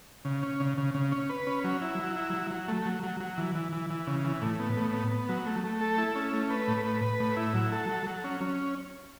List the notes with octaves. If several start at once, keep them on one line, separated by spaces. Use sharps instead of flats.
C#3
C#4
C#3
C#3
C#3
C#4
B4
C#4
F#3
E4
F#3
E4
F#3
F#3
A3
F#3
F#3
F#3
E3
E3
E3
E3
C#3
E3
A2
B3
A2
B3
B3
F#3
A3
A3
A4
E4
C#4
A3
B4
A2
B4
B4
A2
E4
F#3
A4
F#3
F#3
C#4
C#4